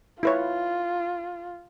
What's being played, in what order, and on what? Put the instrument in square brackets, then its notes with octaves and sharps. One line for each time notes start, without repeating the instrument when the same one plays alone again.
[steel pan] E4 B4 C#5 [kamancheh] F4